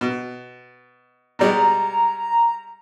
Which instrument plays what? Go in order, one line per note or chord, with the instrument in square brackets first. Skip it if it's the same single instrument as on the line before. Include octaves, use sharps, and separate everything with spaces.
[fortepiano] B2
[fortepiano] B2 G3 G#3 [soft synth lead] A#5